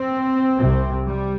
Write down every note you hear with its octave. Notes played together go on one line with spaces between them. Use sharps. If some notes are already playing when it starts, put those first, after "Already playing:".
Already playing: C4
C2 C3
G3